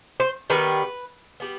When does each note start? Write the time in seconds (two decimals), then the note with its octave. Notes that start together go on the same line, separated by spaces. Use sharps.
0.20 C5
0.50 D#3 G3 B3 B4
1.40 G3 B3